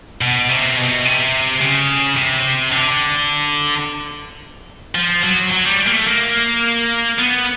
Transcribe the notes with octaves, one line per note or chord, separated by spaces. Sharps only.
B2
C3
B2
C3
C#3
C3
D3
F3
F#3
F#3
G3
A#3
A3
A#3
B3